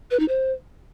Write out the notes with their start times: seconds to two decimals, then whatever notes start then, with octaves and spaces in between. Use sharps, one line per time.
0.11 B4
0.19 D#4
0.28 C5